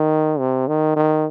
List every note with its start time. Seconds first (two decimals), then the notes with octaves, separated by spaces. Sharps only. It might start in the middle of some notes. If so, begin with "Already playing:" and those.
Already playing: D#3
0.39 C3
0.68 D#3
0.96 D#3